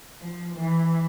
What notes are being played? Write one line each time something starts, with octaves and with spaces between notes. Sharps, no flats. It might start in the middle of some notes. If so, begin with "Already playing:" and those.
F3
E3